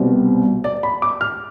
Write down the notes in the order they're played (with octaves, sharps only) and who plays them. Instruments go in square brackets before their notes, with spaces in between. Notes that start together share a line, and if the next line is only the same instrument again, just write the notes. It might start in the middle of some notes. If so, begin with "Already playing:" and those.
Already playing: [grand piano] C2 B2 G3 C4
D5
B5
D6
F6